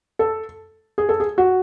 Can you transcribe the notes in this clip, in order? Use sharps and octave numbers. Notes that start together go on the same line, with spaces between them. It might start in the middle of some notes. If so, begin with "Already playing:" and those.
A4
G#4
A4
G#4
F#4